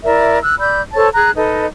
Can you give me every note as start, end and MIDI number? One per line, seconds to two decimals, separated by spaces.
0.04 0.39 64
0.04 0.39 70
0.04 0.39 74
0.04 0.39 76
0.42 0.55 88
0.42 0.55 90
0.59 0.81 74
0.59 0.81 83
0.59 0.81 88
0.59 0.81 91
0.94 1.08 69
0.94 1.08 72
0.94 1.08 73
0.94 1.08 81
1.13 1.30 68
1.13 1.30 82
1.13 1.30 90
1.36 1.65 63
1.36 1.65 69
1.36 1.65 71
1.36 1.65 75